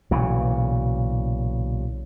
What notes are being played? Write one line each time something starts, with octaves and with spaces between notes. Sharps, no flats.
B1 A#2 C#3 E3